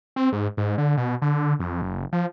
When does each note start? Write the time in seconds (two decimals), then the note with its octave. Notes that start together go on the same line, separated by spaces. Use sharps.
0.16 C4
0.32 G#2
0.57 G#2
0.78 D3
0.97 B2
1.22 D3
1.60 F2
1.82 F#1
2.13 F3